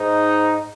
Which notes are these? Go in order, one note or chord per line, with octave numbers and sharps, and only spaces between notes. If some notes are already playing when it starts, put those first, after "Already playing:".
Already playing: G#2 D#4